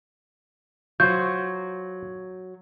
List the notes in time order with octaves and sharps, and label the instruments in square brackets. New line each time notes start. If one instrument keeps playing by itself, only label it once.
[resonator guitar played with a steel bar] F#3 [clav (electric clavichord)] F4 C5 [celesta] G6